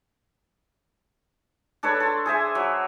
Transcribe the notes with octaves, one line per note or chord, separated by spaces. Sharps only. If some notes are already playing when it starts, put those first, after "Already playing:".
D4 A4 B4 C#5
A4 C6
G#4 C5 E5 G#5
F#3